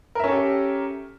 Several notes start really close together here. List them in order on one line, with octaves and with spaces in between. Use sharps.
A#4 E5 C#4 A4 G4